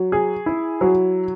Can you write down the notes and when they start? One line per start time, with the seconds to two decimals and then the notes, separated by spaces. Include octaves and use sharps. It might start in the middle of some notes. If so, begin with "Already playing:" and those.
Already playing: F#3
0.12 G#4
0.46 E4
0.81 F#3